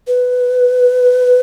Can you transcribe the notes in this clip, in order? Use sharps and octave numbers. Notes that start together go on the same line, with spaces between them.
B4